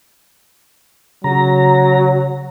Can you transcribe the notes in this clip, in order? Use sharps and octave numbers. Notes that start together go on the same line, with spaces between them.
C#3 F#3 F#4 A#5